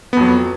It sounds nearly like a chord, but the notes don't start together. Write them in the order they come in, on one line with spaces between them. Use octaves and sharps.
B3 F2 F#3